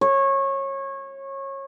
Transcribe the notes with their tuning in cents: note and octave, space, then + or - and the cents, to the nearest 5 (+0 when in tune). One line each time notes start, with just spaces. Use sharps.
C#5 -25